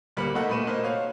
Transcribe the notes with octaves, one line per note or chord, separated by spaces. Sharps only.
D1 G3 A#3 B4 B5 C#7
A3 A#3 D#4 F#4 A4 F#5
A#2 A3 A#3 B4 D#7 E7
A#3 D#4 F#4 C5
C#5 F5